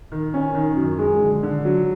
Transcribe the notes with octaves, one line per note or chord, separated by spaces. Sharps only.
D#3
C#4
D#3
F#2
G#3
D3
D3
F#3